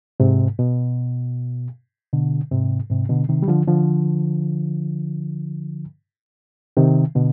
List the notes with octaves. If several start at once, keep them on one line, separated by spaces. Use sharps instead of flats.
G#2 C3
B2
B2 D3
G#2 C3
G#2 C3
B2 D3
C3 D#3
G3
D3 F3
D3 F3
C3 D#3
B2 D3